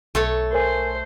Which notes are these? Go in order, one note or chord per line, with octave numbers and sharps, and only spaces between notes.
B1 A3 C#5 A5
A#4 C5 G#5